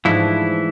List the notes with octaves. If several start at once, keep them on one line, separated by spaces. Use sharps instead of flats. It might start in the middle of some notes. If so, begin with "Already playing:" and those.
G#2 E3 F3 A3 D4 E4